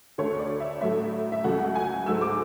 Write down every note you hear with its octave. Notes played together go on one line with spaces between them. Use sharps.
D2 D3 A3 C#5
D5
E5
A2 F#3 A3 E5
E5
C#2 C#3 F#3 A3 F#5
G#5
G#2 F#3 A3 E6
D6